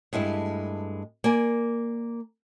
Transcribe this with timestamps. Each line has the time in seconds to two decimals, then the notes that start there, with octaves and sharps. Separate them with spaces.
0.13 G2 G#3 A3 E4
1.24 A#3 D5 G#5